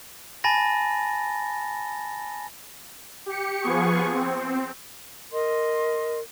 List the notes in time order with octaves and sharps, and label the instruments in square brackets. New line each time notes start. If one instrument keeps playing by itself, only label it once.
[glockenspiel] G#5 A5 B5 A6 A#6
[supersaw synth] G4 C#7
F3 B3 G#4 C#6
C4
[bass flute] A#4 [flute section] D#5 C6